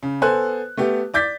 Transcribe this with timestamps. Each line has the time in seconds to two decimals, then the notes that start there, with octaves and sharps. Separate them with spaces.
0.03 C#3
0.22 B3 A4 C5 G#5 F#6
0.77 A3 B3 G4
1.14 D5 D6 G6 A6 B6